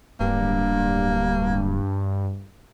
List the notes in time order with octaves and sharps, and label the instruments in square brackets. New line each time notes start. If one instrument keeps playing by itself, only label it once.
[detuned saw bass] D1 [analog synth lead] G2 [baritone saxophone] A#3